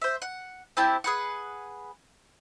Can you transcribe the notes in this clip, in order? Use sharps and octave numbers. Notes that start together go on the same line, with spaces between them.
C5 E5
F#5
C4 E4 G4 A5
G#4 B4 F#5